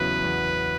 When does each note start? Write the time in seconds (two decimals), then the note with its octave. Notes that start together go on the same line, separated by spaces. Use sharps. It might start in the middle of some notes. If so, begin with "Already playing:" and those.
Already playing: E2 C#3 F#3 B3 E4 B4
0.24 E2